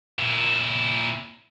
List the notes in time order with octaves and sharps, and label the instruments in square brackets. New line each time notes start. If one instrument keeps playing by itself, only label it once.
[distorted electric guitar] A#2 E4